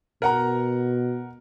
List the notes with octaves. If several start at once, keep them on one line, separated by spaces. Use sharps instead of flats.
B2 A#4 F#5 A#5